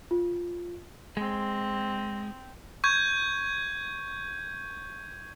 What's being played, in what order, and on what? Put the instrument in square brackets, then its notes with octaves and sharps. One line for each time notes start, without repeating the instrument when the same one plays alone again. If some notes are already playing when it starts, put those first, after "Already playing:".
[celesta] F4
[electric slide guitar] G#3 [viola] C4
[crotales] C#6 G6 G#6